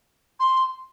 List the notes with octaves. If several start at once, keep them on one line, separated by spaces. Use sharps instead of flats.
C6